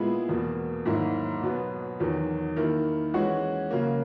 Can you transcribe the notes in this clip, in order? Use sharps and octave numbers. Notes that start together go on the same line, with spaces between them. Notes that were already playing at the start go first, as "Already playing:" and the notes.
Already playing: A#2 G#3 B3 E4 G#4
E2 B2 A#3
G#2 D#3 F#3 A#3 E4
B2 F#3 B3
E2 D#3 F#3
D#3 A#3 E4
E3 G#3 C#4 F#4
C#3 F#3 A#3